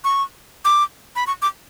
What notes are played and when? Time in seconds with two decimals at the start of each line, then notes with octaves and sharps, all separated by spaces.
0.04 C#6
0.65 D6
1.16 B5
1.27 C#6
1.42 D6